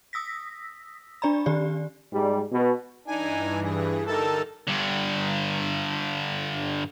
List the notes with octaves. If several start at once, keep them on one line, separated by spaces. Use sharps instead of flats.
D#6 E6 A#6 B6
D4 D5 A#5 B5
D#3 G4 D5
G#2 G3
B2
G2 E3 D4 D#4 G#5
G#4
D3 G3 D#4 A4 A#4 A5
G2 D3